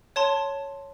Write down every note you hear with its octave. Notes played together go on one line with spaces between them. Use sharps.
C#5 A5 C6